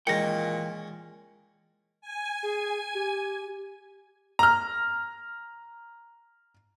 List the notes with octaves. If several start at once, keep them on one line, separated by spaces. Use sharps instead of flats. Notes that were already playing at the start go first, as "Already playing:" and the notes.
A#2 D#3 E3 G#3 C#4 G5 A#6 C#7
G#5
G#4
G4
A#5 F6